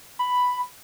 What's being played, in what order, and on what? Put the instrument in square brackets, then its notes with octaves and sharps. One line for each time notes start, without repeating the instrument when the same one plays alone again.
[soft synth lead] B5